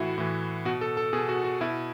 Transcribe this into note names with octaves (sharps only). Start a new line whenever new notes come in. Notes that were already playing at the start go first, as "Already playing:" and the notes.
Already playing: A2 E3 E4 F#4
A2 E3
B2 F#4
A4
A4
B2 G#4
F#4
F#4
B2 E4